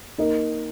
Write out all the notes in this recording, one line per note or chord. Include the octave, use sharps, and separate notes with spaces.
A#3 D#4 A#4 D#5